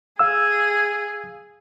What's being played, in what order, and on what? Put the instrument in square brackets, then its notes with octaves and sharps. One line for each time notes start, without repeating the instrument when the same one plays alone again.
[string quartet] G#4 [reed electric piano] F5 E6